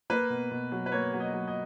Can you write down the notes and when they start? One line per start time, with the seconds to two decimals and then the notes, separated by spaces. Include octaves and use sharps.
0.10 A#3 B4
0.30 B2
0.51 B2
0.72 F#3
0.86 B4
0.92 A#3 C#5
1.13 F#3
1.20 D#5
1.33 F#3
1.48 D#5